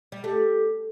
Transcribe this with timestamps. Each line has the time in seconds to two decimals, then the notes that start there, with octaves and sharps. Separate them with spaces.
0.12 G3
0.24 A3 G4